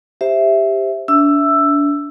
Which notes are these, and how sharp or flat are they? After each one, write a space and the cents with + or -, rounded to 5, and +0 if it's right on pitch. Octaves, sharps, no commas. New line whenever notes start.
G4 +10 C5 +0 E5 +0
D4 -35 E5 +0 E6 +10